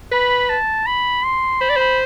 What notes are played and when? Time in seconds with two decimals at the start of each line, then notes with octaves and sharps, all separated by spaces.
0.12 B4 B5
0.49 A5
0.87 B5
1.24 C6
1.61 C5 B5
1.69 D5
1.76 C5 B5